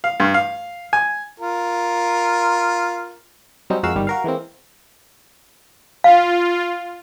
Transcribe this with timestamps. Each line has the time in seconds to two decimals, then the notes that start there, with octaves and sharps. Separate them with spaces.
0.04 F5
0.20 G2
0.34 F5
0.93 G#5
1.40 F4 A#4
3.70 F#3 G3 C4 C#4 D#4
3.83 F2 G#3 F#4 A#4 F5 E6
3.95 G1 D#3 G3
4.07 F#4 A#4 F5
4.24 E3 G#3 A#3 C4
6.04 F4 F5